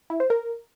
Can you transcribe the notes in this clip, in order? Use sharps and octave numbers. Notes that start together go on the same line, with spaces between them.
E4
C5
A#4